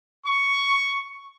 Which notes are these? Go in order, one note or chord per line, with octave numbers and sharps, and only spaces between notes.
C#6